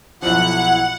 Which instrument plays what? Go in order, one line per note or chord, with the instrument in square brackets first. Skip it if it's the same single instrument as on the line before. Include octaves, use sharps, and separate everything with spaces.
[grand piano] B1 F3 [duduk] E4 [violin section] F#5